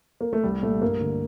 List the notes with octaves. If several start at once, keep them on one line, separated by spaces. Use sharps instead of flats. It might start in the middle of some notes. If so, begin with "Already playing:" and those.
A#3
A3
C2 G3
A#2 A3
G2 A#3
D3